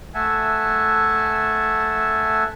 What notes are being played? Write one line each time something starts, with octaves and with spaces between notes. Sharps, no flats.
A3 E5 F#5 G#5 A5